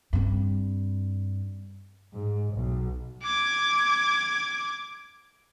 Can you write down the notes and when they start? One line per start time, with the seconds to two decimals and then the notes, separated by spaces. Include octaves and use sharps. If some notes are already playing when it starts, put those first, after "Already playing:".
0.13 G2 C4
2.13 G#2
2.54 B1
3.23 D6 G#6